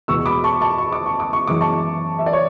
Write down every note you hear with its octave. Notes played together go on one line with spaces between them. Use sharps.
E2 B2 G#3 B3 C#6 E6
B5 D6
A5 C#6
A5 C#6
C#6
D6
C#6
D6
C#6
F#2 E3 G#3 B3 D6
A5 C#6
E5
D5
C#5